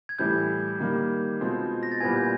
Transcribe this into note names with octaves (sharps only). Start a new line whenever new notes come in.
G#6
A2 E3 G3 G6
D#3 G3 A#3
B2 G#3 C4 F4
A#6
A6
A#2 G3 B3 E4 G#5 G#6
G6